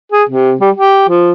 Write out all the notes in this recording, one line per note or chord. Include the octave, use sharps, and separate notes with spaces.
G#4
C3
G3
G4
F3